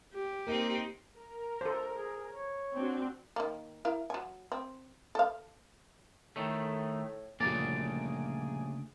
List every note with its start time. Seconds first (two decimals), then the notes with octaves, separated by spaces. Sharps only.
0.14 G4
0.47 A#3 C4 D#4
1.17 A#4
1.61 A4 C5
1.93 G#4
2.30 C#5
2.74 C4 D4 F#4
3.36 D#3 A#3
3.85 E4 A#4 F5
4.10 F#3 G#5
4.52 C4
5.15 A4 F5
6.36 A2 D#3 A3
7.40 D2 A#2 C#3 F3 G3 A#3 G#4 D5